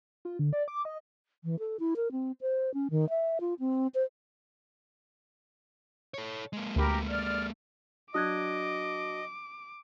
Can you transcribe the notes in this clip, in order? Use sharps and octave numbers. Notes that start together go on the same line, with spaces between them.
F4
D3
D5
D6
D#5
E3
A4
E4
A#4
C4
C5
C#4
D#3
E5
F4
C4
C5
A4 C#5
G#3 A#3
D2 G4 A#4 B5
D5 F6
F#3 D4 D#5 D6 D#6 F#6 G#6